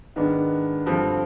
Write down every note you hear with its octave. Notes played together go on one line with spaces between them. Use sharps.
G#2 D#3 B3 D4
G2 D3 F3 C4